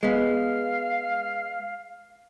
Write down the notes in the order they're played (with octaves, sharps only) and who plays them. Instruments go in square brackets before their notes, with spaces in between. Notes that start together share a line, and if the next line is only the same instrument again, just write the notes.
[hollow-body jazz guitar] G#3 B3 [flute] F5